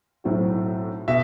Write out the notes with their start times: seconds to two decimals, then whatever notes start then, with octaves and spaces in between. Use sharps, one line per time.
0.24 B1 A2 F#3 C4 F#4
1.08 B2 E5